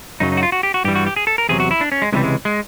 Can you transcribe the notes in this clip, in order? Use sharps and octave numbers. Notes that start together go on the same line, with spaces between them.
F#2 C#3 F#3 D#4
D#4
F#4
F4
F#4
G4
F#4
G2 E3 G3 G4
F#4
G4
G#4
A4
A#4
E2 C3 D#3 F#3 G#4
F#4
E4
D4
C#4
G#3
C#2 C3 E3 G3 G#3
G#3
G#3